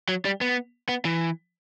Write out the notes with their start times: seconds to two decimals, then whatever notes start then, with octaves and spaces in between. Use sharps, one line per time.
0.09 F#3
0.25 G3
0.41 B3
0.89 B3
1.05 E3